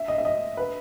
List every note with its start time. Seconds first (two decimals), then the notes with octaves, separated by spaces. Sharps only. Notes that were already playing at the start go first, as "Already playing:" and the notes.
Already playing: E5
0.08 D#5
0.18 E5
0.25 D#5
0.57 B4